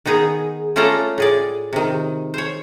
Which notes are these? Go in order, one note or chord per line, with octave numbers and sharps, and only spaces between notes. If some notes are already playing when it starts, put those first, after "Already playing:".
D#3 B3 D#4 G#4
A3 C#4 F4 A4 D5 A#5
A2 G#4 D5
C3 D#3
C5 C#5